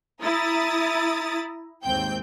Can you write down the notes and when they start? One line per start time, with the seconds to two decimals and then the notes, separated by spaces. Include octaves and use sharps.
0.22 E4 A#5 D#6 A6
1.84 D#2 G#2 C4 G5 G6